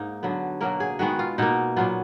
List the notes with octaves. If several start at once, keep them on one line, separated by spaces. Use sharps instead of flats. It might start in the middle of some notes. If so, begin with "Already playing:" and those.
Already playing: G#2 A#3 D#4
D3 F#3 B3
B2 F#3 A#3 A#4
G#4
D#3 G#3 B3 F#4
F4
B2 A#3 D#4
A#2 F#3 B3 F4